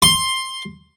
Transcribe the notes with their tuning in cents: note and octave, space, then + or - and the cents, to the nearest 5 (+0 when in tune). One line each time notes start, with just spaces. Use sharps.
C6 +10